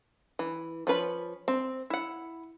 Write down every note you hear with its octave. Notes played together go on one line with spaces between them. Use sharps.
E3
F3 C#4 B4 B5
C4
E4 F#5